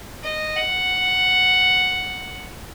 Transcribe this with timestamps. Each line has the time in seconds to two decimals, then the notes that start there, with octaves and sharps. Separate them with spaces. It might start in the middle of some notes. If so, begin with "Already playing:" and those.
0.23 D#5
0.56 F#5